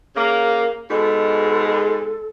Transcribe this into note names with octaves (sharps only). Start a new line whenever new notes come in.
C#3 A#3 A#4
G#2 B2 G#3 A4